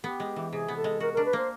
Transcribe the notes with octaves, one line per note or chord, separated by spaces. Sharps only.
B3 G4
G#3
E3
C3 G#4
B3
A4
G#3
F#4 A#4
D4 A#4
B4
A#3 C5